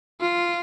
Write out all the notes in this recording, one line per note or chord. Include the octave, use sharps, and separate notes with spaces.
F4